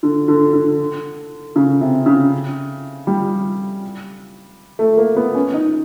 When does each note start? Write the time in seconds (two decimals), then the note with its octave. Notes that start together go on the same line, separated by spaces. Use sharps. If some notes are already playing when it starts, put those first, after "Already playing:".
0.03 D3
0.28 D3
0.53 D3
1.56 C#3
1.81 C3
2.06 C#3
3.07 G3
4.79 A3
4.97 A#3
5.16 B3
5.35 C#4
5.54 D#4